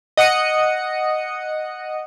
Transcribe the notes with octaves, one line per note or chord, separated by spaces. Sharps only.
D#5 F#5 D#6 C#7